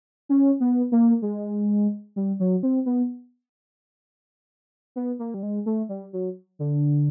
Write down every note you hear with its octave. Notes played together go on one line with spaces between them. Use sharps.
C#4
B3
A#3
G#3
G3
F#3
C4
B3
B3
A#3
G3
G#3
A3
G3
F#3
D3